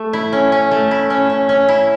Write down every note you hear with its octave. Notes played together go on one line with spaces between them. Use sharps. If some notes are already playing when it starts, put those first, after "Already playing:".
Already playing: A3
E4
C#4
C#4
A3
E4
C#4
C#4
C#4
E4